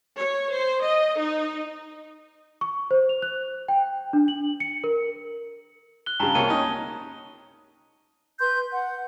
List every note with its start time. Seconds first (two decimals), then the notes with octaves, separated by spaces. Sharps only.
0.16 C#5
0.52 C5
0.83 D#5
1.18 D#4
2.61 C#6
2.91 C5
3.09 F7
3.22 F#6
3.68 G5
4.13 D4
4.28 F#7
4.60 C#7
4.84 A#4
6.06 F#6 G7
6.20 G2 C#3 A5 A#5 G7
6.35 C2 A#3 C#5 D#7
6.48 C#4 D#4
8.40 B4 C6 G6
8.72 F#5